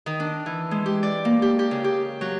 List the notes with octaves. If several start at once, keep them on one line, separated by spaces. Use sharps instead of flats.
D#3
D4
E3
G#3
G4
D5
A#3
G4
G4
C#3
G4
F#3